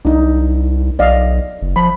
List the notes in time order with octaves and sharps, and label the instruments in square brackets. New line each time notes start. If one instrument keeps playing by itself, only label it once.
[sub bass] C2 [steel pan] D4 D#4
[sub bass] B1 [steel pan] D5 D#5 F5
[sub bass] F#1
[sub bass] F3 [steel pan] B5